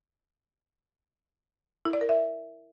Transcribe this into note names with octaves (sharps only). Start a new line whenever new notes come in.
E4
D5
A#4
E5